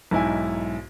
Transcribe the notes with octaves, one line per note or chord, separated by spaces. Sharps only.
B1 G#2 E4 G#5